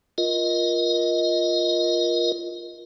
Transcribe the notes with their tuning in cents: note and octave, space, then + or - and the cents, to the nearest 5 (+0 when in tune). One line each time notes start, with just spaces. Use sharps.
F4 +0 A#4 +20 D#5 +10